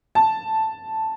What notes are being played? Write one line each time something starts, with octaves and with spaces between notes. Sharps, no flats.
A5